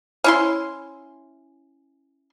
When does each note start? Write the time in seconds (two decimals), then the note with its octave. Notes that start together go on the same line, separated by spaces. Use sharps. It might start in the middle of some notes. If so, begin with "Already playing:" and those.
0.24 C#4 E4 C6